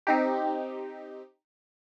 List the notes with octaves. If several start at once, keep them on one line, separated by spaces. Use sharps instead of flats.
C4 D#4 G4